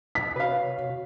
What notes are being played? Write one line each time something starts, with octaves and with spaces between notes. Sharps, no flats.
B6
C3 F#4 B4 C#5 F5